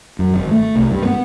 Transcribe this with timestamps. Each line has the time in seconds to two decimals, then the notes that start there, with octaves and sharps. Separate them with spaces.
0.19 F#2
0.34 G#1
0.51 A3
0.76 C2
0.92 G2
1.05 B3